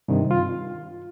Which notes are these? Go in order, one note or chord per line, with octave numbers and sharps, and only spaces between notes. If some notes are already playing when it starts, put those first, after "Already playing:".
G2 C3 D#3
F4